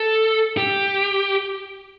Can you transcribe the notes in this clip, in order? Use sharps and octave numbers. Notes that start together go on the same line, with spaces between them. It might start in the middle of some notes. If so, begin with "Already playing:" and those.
Already playing: A4
G4